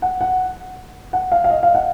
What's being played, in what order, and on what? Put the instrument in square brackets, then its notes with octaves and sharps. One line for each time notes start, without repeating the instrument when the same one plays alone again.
[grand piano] F#5
F#5
F#5
F5
F5
D#5
F5
F#5